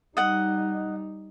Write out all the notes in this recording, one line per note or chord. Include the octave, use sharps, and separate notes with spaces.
G3 D#4 D#5 F#5